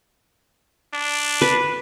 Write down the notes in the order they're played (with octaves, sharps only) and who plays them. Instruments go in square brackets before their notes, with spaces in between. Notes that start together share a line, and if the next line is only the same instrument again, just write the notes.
[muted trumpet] D4
[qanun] B4